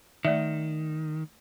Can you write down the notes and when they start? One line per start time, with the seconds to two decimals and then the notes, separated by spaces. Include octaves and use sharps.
0.25 D#3 A3 D5 E5